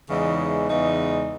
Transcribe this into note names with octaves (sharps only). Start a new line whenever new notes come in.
E2 C#3 E3 G#3 D#4
E2 C#3 E3 G#3 D#4